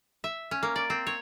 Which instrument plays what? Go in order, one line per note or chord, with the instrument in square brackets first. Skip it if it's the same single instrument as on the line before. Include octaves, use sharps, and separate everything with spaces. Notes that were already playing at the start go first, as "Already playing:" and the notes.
[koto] E5
C#4
A#3
D5
C4
C#5